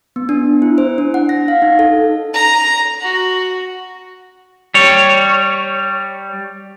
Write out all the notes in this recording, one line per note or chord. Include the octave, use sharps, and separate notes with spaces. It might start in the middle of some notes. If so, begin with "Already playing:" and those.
B3
D4
E4
C5
D4
F#5
A#6
F5
D#4
A4
A#5
F#4
G3 C#5